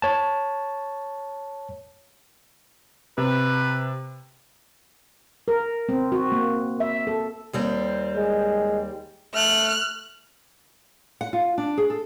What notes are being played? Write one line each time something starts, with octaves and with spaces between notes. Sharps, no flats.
C#5 A5
C3 B4
A#4
C4
F#4
A#3
E5
A4
D#2 G3 C4
G#3
A3 F6 F#6
F#5
F4
D4
G#4
A4